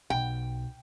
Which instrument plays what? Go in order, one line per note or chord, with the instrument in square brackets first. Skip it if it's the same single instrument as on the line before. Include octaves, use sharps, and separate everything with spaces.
[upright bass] B1 [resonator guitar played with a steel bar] G5